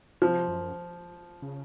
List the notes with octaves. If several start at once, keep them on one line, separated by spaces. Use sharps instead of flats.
C3 F3
F#2
C#3